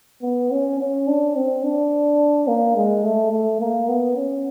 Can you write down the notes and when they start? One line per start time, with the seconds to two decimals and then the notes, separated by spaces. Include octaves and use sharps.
0.22 B3
0.51 C#4
0.79 C#4
1.07 D4
1.35 C4
1.63 D4
2.47 A#3
2.76 G#3
3.04 A3
3.32 A3
3.60 A#3
3.88 B3
4.16 C#4